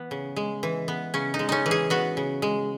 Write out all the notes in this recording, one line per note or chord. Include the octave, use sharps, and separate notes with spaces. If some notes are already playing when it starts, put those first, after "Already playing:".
Already playing: E3 B3
C#3
G#3
E3
B3
C#3 C#4
D#4
G#3
C#4 D#4
E3
G#4
B3 F#4
C#3
G#3